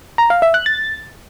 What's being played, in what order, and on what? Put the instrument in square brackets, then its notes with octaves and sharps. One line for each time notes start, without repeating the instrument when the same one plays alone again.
[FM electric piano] A#5
F5
E5
F#6
A6